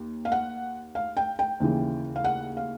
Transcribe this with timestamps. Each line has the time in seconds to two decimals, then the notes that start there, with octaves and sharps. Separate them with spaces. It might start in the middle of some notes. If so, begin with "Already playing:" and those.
Already playing: D#2
0.25 F5
0.32 F#5
0.95 F5
1.17 G5
1.39 G5
1.60 D#2 C#3 E3
2.16 F5
2.24 F#5
2.57 F5